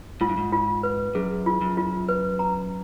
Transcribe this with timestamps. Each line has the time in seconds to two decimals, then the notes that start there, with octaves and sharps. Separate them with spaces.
0.21 G#2 F4
0.29 G2
0.37 G#2
0.53 F4
0.83 B4
1.15 F#2 G#4
1.46 F4
1.61 F#2
1.77 F4
2.09 B4
2.39 A#5